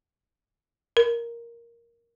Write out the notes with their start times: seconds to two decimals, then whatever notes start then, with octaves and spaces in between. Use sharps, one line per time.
0.97 A#4